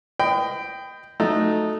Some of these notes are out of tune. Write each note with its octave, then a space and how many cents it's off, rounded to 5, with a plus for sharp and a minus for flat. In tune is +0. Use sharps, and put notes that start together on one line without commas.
D#5 +0 G5 +0 B5 +35
F#3 -20 A3 -5 D#4 -10